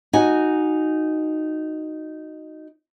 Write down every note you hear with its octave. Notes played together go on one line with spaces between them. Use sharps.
D#4 F#4 G#5